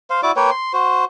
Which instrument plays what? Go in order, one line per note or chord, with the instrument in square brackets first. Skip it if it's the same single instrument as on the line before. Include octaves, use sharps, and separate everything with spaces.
[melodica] C5 F5
E4 F#4 D5 D6
A#3 B4 C#5 G5
C6
F#4 C5